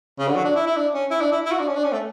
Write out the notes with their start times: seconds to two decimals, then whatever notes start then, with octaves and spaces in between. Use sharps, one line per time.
0.19 C#3
0.28 D3
0.36 F#3
0.45 D4
0.56 E4
0.67 E4
0.77 D4
0.94 C#4
1.11 E4
1.21 D4
1.32 E4
1.45 E4
1.51 F#4
1.59 D4
1.68 C#4
1.75 D4
1.84 C#4
1.93 A3